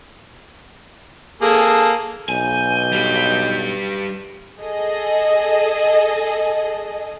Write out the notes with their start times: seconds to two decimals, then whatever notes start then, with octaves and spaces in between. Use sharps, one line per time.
1.42 A#3 G#4 A4
2.29 B1 G#5 G6
2.92 G3 B4
4.60 G#4 A4 D#5